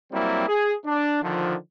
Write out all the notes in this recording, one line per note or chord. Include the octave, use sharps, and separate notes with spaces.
F#3 G3 A#3 C4 E4
G#4
D4
D3 D#3 F3